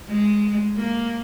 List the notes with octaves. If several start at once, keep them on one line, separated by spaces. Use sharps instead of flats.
G#3
A#3